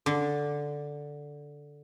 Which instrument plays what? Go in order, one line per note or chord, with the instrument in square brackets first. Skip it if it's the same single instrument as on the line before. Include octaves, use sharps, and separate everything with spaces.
[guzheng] D3 D4